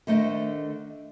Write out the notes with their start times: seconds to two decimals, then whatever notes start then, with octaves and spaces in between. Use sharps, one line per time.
0.07 D3 D#3 A3 D4 C5 D#5